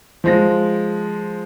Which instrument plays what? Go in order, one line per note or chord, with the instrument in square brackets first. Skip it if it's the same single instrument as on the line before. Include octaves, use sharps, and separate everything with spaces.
[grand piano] F3 G#3 A#6